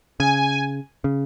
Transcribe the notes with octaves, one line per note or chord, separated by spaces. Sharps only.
C#3 G#5
C#3